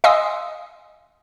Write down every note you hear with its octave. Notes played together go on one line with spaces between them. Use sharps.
D#5 F5 G#5 C6 D#6 E6